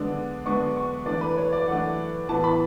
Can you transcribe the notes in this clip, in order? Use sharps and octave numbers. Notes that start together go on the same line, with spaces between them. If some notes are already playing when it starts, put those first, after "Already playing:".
Already playing: D3 G#3 B3 D4
D3 G#3 B3 D4 C#6
C#6
E3 A3 D4 D5
B4
C#5
D5
E3 A3 D4 F#5
A2 E3 B3 A5
B5